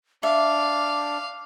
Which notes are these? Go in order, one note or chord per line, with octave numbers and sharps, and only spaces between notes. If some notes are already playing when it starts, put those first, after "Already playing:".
D4 E5 F5 D6